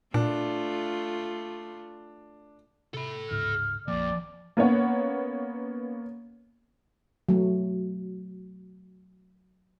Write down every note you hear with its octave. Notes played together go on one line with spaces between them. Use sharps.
A#2 A3 D4 F4
C3 A4 B5
D1 G#2 C#3 F6
A#1 F2 A#3 D5
A#3 B3 C#4 C#5 F#5
F#3 A3